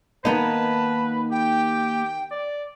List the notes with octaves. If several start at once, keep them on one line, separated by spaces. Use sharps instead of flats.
D#3 A#3 B3 D#4 B4 A5 A#5
G4 G5
D5